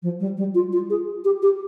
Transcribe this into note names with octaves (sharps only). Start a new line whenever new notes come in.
F3
G3
G3
F4
F4
G#4
G4
G4